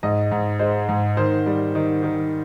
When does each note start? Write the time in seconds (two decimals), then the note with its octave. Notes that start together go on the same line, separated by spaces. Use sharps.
0.03 G#2 D#5
0.31 G#2
0.59 G#3 C5
0.89 G#2
1.17 D#3 C5
1.46 G3
1.75 D#3
2.03 D#3